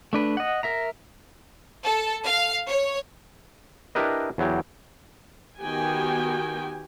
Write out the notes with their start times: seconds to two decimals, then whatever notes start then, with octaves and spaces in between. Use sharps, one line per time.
0.13 A3 D4 B4
0.37 D#5 F#5
0.63 A#4 E5 A#5
1.84 A4
2.24 F5
2.69 C#5
3.95 D4 E4 G4 A#4 B4 D#5
4.38 E2 F#3 G4
5.61 D#3 B3 F#4 G4 G5 G#5